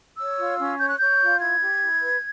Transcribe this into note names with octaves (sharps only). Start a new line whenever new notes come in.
C#5 E6
F4
C#4
C#5 G6
F#6
C#5 G6
F4
E4 G#6
G4
E4
B4